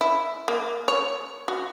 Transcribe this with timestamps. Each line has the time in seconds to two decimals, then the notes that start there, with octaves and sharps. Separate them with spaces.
0.01 E4
0.48 A#3
0.88 C#5
1.48 F#4